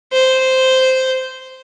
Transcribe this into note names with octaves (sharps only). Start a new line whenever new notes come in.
C5